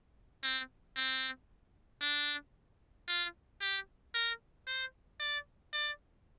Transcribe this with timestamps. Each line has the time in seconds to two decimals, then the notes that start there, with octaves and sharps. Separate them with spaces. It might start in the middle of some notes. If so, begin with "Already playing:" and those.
0.43 C4
0.96 C4
2.02 D4
3.08 F4
3.61 G4
4.15 A#4
4.67 C5
5.20 D5
5.73 D5